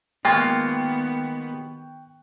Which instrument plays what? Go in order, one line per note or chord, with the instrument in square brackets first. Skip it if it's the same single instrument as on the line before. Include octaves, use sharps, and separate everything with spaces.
[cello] D#3 B3 [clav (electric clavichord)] G#3 A#3 F4 [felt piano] G5 C#6 F#6